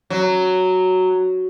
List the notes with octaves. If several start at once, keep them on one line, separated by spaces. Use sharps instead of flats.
F#3